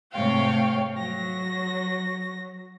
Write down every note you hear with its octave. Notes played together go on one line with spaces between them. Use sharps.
G#2 C3 A3 C#5 F5 G5
F#3 A#6